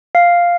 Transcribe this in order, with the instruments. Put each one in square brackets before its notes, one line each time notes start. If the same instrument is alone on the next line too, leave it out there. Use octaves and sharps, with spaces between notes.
[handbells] F5